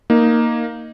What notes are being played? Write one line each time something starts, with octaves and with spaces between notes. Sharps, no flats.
A#3 D#4